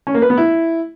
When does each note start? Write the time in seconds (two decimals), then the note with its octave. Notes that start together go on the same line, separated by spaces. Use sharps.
0.07 C#4
0.14 A#3
0.22 B4
0.30 B3
0.38 E4